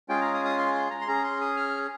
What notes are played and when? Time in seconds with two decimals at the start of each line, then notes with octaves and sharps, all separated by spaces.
0.09 G#3 C#4 F4 G#4 G5
0.21 A#5
0.34 D#6
0.45 D#6
0.58 C6
0.75 C6
0.91 A#5
1.01 C6
1.08 C#4 G#4 A#5
1.24 C6
1.41 D#6
1.57 F6